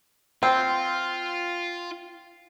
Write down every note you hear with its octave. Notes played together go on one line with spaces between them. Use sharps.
C4 F4